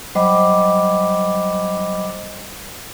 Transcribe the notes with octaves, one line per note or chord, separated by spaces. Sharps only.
F#3 G3 C5 D#5 B5 D6